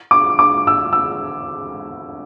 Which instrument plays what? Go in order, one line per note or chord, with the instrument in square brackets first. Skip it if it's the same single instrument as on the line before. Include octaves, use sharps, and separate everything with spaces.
[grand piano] D6
D6
E6
E6